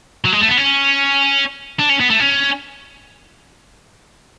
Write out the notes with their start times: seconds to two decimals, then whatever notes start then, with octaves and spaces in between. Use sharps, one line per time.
0.25 F#3
0.32 G#3
0.41 A3
0.48 B3
0.57 C#4
1.79 D4
1.89 C#4
2.00 B3
2.10 A3
2.20 C#4